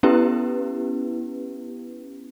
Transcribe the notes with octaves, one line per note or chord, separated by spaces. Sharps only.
B3 C#4 E4 G4 B4